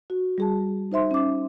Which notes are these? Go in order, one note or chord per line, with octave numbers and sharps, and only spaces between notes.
F#4
G3 G#4 A5
D#4 C5 E5 C6
C#4 D6